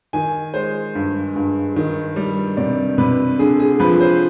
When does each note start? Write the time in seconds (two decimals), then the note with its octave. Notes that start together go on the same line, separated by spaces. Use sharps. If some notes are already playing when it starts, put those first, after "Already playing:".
0.13 D#3 G#5
0.54 G#3 C5
0.95 G2
1.36 G2
1.76 D#3
2.16 G3
2.57 C3 D5
2.98 C3 B4
3.39 D3 G#4
3.60 G#4
3.80 F3 B4
4.01 C5